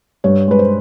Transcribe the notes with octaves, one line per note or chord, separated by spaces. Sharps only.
G2 C#5
G#3 B4
C5